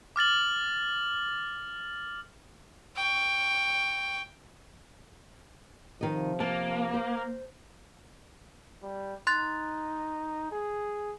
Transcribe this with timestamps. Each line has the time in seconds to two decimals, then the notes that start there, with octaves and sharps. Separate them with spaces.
0.16 D6 F6 A6 F#7
2.96 G5 C#6
6.01 C3 D#3 F3 D#5
6.40 A#3 A5
6.94 C5
8.82 G3
9.27 D#4 C6 F#6 A6
10.52 G#4